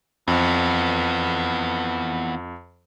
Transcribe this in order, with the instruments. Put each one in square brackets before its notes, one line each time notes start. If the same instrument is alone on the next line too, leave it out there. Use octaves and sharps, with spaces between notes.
[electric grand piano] F2 [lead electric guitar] E3 B3